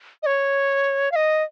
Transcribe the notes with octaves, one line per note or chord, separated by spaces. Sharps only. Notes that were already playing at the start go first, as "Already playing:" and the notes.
D#5
C#5
F5
D#5